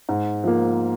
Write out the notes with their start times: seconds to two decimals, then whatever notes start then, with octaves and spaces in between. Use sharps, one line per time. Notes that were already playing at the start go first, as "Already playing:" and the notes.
0.09 G#2
0.44 F3 A#3